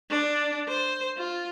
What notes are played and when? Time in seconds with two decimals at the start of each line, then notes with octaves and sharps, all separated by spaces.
0.10 D4
0.68 C5
1.17 F4